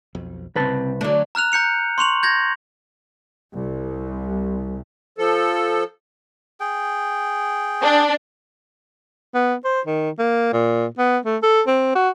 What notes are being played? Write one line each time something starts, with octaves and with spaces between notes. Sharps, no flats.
B1 F2
C2 C#3 C4 B4 A5
D3 F#3 A3 D4
A#5 F6 F#6 F7
A#5 G6 C#7 F7
C6 C#6 F7 F#7
G6 G#6 A#6
C2
F3 A4
G#4 G5
D4
B3
C5
D#3
A#3
A#2
B3
A3
A4
C4
F#4